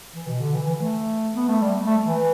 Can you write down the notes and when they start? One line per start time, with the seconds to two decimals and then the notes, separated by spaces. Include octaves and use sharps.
0.14 E3
0.27 B2
0.41 D3
0.53 E3
0.68 E3
0.81 A3
1.35 B3
1.49 A3
1.62 G3
1.86 A3
2.06 E3